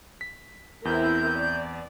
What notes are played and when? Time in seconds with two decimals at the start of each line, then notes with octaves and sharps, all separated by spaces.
0.21 B6
0.85 E2 C4 E4 A#4 G6
1.38 D5